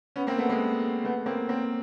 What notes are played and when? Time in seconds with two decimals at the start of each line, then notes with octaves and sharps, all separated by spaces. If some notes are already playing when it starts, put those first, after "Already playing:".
0.16 B3 C#4
0.27 A#3 C4
0.38 A3 B3
0.49 G#3 A#3
1.04 A3 B3
1.26 A#3 C4
1.49 A#3 C4